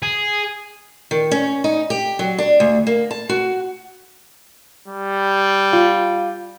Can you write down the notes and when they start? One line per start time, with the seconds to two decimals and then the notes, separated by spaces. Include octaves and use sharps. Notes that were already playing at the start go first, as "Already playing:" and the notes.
0.03 G#4
1.11 D#3
1.31 C#4
1.64 D#4
1.90 G4
2.19 F#3
2.38 D4
2.60 D2
2.87 A#3
3.11 A5
3.29 F#4
4.88 G3
5.73 F4